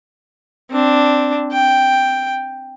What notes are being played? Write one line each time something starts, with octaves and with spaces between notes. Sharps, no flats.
C4 D4
G5